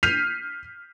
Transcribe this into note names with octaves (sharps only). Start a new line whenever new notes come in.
F6 G6 B6 C7 D#7 F7